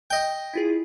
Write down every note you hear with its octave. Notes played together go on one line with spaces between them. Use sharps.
D#5 G5
E4 F4 G#4